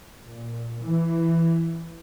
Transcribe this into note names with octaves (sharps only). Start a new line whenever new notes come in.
A#2
E3